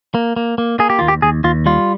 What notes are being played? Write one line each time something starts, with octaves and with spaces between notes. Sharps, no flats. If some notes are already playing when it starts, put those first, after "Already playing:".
A#3
A#3
A#3
A#3 G#4
G4
D#2 F4
G4
D#2 G#4
D#2 F4
G3 F4